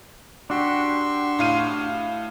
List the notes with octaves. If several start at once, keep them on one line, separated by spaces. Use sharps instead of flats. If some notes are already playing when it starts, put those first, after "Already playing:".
D4 F#4 G4 C6 C#6 E6
A2 F5 D#7